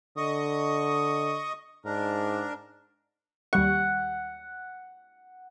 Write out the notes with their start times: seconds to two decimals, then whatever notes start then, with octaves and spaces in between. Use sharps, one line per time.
0.17 D3 D#5 C#6 D#6
1.85 G#2 D4 A#4
3.53 D#2 G3 F#5 C#6